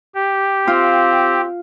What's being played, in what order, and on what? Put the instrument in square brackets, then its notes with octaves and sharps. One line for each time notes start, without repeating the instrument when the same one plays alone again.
[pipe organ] G4
[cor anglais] C4 [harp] F4